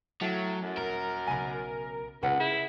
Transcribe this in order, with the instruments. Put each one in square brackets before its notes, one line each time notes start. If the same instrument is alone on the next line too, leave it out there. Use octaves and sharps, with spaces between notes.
[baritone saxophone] A2 [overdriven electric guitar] F#3
[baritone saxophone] F#2
[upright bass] D#1 [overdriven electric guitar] A#4
[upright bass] B1 C#3 [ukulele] G#5 B5
[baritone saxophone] C#2 [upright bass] C#3 [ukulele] B4 C#5 F#5
[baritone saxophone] E4 [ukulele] G#4